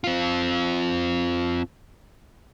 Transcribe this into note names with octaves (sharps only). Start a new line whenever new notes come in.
C4 F4